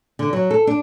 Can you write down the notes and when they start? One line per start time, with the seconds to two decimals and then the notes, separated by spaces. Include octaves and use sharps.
0.19 D3
0.33 F#3
0.51 A4
0.67 D4